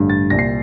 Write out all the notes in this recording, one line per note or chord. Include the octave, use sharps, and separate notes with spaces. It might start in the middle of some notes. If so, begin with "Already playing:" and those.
Already playing: A1 G2 D3
A6
C2 A#2 A#6
C7